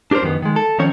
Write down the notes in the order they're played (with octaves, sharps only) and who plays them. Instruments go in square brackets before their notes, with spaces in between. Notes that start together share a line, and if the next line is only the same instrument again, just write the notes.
[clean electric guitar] D4 G4 A4 A#4 C5
F#2 D#3 B3
D#3 G#3
A4
D#3 F3 C4 C#4 C#5